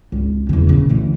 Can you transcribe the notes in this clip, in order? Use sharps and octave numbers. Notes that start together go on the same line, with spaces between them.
G#1 C#2
E2 C#3
A#2 C#3
D2 E3